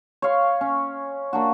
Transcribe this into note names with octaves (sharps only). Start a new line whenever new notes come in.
C#5 F5 C6
C#4
A#3 D4 F#4